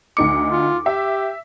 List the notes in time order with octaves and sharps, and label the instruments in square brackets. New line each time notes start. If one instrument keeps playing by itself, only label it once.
[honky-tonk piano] D2 D#4 C#7 [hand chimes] D6
[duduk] F4
[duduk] G4 [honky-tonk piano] E5